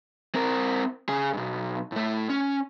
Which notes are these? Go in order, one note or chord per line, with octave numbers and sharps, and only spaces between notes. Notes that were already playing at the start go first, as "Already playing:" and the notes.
C4 A#4
C#3 G#4
B1 G2
A2 A3
C#4